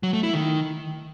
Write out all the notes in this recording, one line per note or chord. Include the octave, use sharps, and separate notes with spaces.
F#3
A3
E4
D#3